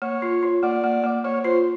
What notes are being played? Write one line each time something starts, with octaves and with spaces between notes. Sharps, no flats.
A#3 C#5
F4
F4
A#3 D5
A#3
A#3
A#3 C#5
F4 C5